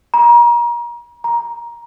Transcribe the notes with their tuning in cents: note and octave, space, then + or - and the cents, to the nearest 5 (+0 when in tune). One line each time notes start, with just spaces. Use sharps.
A#5 +35
A#5 +15